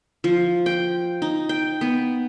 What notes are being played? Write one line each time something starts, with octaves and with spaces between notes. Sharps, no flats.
F3
G5
D#4
G5
B3